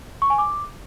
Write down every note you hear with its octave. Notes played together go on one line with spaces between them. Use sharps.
C#6
G#5
D6